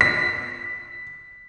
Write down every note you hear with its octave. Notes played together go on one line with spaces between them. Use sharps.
B6